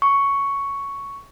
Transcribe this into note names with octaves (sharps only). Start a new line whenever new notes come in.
C#6